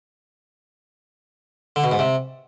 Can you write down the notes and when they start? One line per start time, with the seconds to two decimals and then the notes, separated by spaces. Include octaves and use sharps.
1.76 D3
1.84 B2
1.91 G#2
1.99 C3